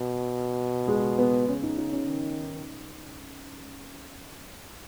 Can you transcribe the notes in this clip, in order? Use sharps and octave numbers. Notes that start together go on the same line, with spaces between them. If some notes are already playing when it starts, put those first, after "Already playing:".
Already playing: B2
G#3
B3
C#3 C#4
D#4
D#4
C#4
D#3